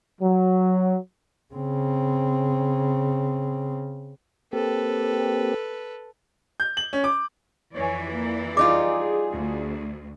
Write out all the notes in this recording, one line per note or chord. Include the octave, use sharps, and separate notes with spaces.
F#3
C#3 C4
A#3 C4 G4 A4 B4
G6
F#7
C#4
D6
F2 E3 C#5 D5 G#5
A#3
G3 D#4 F4 G#4 D6
D2